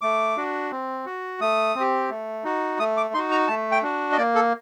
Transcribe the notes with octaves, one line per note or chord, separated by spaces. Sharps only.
A3 D6
D4 F#4
C4
F#4
A3 D#6
C4 G4
A3
D#4 F#4
A3 D#6
D6
D#4 F#4 C6
A#5
A3 A5
G5
D4 F#4
D#5
A#3 D5
A4